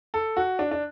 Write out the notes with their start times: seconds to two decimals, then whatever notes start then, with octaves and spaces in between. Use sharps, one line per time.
0.14 A4
0.37 F#4
0.59 D4
0.71 D4